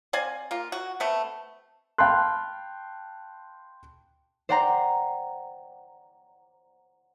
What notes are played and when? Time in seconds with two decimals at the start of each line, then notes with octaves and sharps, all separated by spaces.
0.13 C4 D5 F5 G#5
0.51 A#3 F4
0.72 F#4
1.00 A3 B3 C4
1.98 F5 G5 A5 B5 C6 F#6
4.49 C5 D5 F#5 G5 A#5 C6